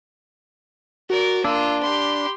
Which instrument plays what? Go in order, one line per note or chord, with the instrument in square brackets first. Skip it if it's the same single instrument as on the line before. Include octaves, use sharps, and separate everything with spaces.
[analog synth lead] F#4 [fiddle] A#4 D5
[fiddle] A#3 F4 [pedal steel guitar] D4 [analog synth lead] E6
[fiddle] G4 C6 [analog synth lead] B5